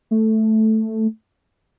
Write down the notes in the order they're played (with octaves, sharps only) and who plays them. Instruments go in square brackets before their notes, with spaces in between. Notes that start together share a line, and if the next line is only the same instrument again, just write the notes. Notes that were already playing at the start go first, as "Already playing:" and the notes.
[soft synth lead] A3